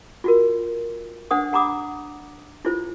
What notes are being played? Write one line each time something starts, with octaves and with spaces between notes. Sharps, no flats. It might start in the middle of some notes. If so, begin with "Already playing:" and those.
F4 F#4 A#4
D4 C5 F#5 D#6
F#5 A#5 B5 D6 D#6
E4 F4 C5